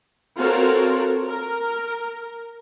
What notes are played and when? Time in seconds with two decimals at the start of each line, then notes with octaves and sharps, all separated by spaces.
0.37 C4 F4 F#4 A4 A#4 C#5
1.26 A#4